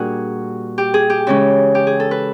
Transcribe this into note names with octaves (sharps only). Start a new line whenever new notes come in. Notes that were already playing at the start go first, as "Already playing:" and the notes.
Already playing: A#2 G3 D4 F#4 G#4 A#4
G4
G#4
G4
C#3 E3 G#3 C#4
G4
G#4
A4
B4